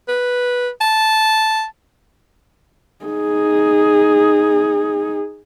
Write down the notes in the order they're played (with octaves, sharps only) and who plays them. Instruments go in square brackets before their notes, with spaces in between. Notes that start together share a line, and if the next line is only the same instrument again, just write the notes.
[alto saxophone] B4
A5
[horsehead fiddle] D#4 G#4